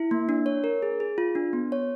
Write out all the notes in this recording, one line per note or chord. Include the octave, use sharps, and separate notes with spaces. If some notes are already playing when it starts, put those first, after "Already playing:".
Already playing: E4
A#3
D4
C#5
A#4
G#4
G#4
F4
D4
B3
C#5